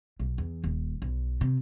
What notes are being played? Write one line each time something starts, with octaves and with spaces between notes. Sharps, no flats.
B1
E2
D#1
B1
C3